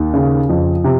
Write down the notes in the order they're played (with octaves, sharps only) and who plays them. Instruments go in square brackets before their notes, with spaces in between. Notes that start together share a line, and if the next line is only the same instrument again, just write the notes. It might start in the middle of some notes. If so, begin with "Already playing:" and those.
Already playing: [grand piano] D#2
C#3
F2
C3